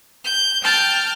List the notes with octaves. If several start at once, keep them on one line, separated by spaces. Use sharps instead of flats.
G6
G5 A5 F6 G6